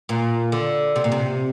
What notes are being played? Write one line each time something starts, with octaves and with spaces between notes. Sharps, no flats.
A#2
D3
C3
A#2
C3